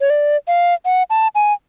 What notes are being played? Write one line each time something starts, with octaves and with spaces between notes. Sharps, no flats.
C#5
D5
F5
F#5
A5
G#5